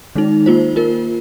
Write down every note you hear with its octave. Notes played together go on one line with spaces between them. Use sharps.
D#3 G#3 D#4
A#3 F4 C5
A#3 F4 A#4